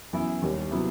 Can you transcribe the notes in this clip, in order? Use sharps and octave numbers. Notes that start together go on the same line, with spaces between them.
F#2 E3 B3 E4
D#2 D#3 G3
C3 F#3 B3 E4